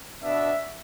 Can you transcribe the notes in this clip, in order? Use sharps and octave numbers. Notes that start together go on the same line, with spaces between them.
B2 B3 D4 E5